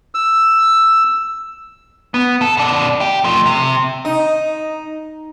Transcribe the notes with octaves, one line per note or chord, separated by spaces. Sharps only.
E6
B3
A4
B2 D5
G4
F3 A3
C3
D#4